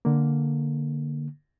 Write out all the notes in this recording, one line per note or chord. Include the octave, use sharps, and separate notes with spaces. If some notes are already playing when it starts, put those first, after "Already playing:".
D3 A#3